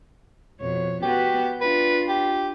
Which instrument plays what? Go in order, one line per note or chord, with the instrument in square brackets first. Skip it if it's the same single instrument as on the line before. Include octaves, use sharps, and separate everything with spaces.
[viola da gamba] F2 B2 C#5
[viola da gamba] B3 F#4 B4 [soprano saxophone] G4
[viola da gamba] D4 F4 [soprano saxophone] B4
[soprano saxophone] G4